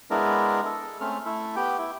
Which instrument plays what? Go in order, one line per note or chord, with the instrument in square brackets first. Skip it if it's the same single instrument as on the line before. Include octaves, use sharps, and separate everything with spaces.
[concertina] G#3 B3 D4 E4 A#4
A4
A3 C4 C#4 F6
A3 E4 A4
B3 G4 G5
E4